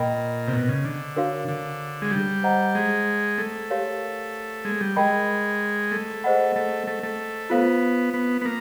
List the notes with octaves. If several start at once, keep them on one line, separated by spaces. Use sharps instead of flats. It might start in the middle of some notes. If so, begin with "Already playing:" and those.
Already playing: A#2 A#4 D#5 G5 B5
C3
B2
C#3
D3
D4 F#4 A#4 C#5 F5
D3
G#3
G3
C5 D#5 F#5 A#5
G#3
A3
G4 A#4 C#5 F5
G#3
G3
G#3 A#4 D#5 G5 B5
A3
G#4 C5 D#5 F#5 B5
A3
A3
A3
B3 F4 A4 C5 F5
B3
B3
A#3